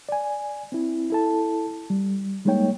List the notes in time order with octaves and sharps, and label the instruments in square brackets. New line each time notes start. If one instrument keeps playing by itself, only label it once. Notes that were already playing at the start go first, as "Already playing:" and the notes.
[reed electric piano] D5 G#5
C4 E4
E4 A4 A5
G3
G3 G#3 A#3 D#4 C#5 G5